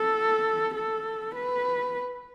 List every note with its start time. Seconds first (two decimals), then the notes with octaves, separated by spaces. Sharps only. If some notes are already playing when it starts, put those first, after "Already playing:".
Already playing: A4
0.74 A4
1.35 B4